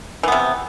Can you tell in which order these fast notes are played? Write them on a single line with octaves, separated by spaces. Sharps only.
E3 B3 C3